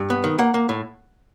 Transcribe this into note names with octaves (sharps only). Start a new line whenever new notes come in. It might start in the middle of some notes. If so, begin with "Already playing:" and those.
Already playing: G2
B3
D#3
A#3 F#5
A#3
A2